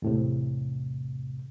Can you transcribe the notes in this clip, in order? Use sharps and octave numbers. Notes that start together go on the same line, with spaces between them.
E2 A2 C3